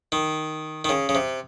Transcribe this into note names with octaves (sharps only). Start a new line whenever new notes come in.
D#3
D#3
C#3
C#3
C3